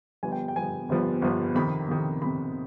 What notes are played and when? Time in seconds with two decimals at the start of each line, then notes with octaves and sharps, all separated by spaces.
0.23 G1 G2 F3 B3 G#5
0.32 G5
0.48 G5
0.56 G1 G2 F3 B3 G#5
0.89 G1 G2 F3 B3
1.22 G1 G2 F3 B3
1.55 F2 C3 D#3 B5
1.89 F2 C3 D#3
2.22 F2 C3 D#3 B5